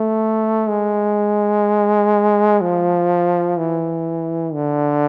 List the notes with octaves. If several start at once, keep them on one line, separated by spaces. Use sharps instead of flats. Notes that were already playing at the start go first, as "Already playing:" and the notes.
Already playing: A3
G#3
F3
E3
D3